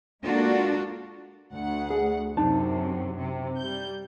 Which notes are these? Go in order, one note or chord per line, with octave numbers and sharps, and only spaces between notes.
G#3 A#3 D4 F4 F#4 A4
D2 F#5
G#4
F#2 C3 D4 D#4 A5
C3
G3 G6